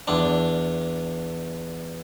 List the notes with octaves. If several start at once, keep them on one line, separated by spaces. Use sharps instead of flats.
E2 D4